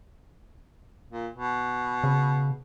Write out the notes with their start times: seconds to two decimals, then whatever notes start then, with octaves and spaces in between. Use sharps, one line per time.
1.11 A#2
1.33 B2
2.04 C#3